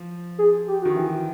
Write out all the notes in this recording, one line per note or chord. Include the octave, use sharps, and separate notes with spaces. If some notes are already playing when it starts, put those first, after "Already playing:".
Already playing: F3
G#4
G4
D#3 F#4
E3